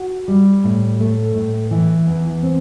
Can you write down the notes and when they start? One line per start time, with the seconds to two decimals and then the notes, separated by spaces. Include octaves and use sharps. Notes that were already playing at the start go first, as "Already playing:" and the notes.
Already playing: F#4
0.28 G3
0.64 A2
1.00 A3
1.35 A2
1.71 E3
2.07 E2
2.43 C4